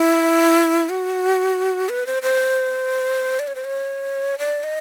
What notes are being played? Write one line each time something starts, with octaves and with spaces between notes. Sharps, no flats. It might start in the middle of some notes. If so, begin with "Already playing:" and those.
Already playing: E4
F#4
B4
C5
C5
D5
C#5
C5
C#5
D5
D#5